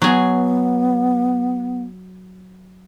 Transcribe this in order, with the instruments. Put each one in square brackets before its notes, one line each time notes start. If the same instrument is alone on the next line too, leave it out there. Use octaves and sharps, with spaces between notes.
[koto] F#3 G#4 [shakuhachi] B3